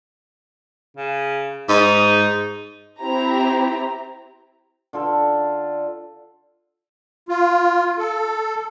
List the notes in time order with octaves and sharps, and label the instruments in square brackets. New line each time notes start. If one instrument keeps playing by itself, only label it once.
[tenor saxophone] C#3
[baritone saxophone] G#2 [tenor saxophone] D#4
[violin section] C4 E4 G4 A#5
[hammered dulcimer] D3 F4 A4
[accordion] F4
A4